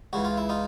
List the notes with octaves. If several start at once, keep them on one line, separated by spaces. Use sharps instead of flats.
C#2 C#3 E3 F#4
F4
E4
D#4 F4